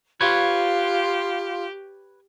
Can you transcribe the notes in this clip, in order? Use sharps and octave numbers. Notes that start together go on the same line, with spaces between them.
F4 G4 B4 C#5